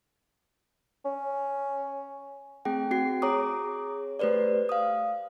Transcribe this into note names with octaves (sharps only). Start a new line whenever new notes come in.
C#4
A3 C4 G#4 G5
C4 F#4 C7
G#4 C#5 A#5 D6 D#6
A3 G4 B4 C5 D5
F5 D#6